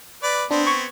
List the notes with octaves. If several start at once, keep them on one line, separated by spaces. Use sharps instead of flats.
B4 D5
B3 C4 D4
C#6 G#6